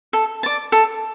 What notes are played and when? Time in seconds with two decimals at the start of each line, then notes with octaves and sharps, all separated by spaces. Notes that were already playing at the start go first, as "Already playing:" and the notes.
0.13 A4
0.43 D5 A5
0.72 A4